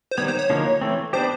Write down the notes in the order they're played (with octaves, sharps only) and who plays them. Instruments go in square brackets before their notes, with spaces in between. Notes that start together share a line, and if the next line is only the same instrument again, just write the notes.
[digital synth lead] C5
[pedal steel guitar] D#3 G3 B3 [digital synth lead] C#5
[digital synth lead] C5
C#5
[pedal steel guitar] D3 F3 A#3 D#4 F#4
E3 A3 C4
[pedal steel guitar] B3 D4 G4 [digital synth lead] C5